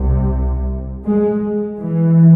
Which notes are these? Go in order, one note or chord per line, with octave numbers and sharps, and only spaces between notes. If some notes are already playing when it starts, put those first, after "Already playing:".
Already playing: C2 C3
G#3
E3